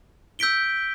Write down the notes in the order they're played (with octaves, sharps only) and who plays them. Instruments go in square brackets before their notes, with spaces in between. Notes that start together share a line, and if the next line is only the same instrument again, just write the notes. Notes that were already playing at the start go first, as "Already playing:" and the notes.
[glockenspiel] E6 G6 B6 D7 G7